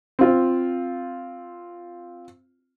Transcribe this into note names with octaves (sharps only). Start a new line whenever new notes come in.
C4 F4